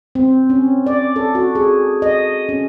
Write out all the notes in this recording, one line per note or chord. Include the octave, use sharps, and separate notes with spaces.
C4
C#4
D5
A4
F#4
G#4
D#5
C#4